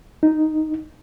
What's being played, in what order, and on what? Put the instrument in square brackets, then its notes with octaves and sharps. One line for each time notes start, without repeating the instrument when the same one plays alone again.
[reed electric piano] D#4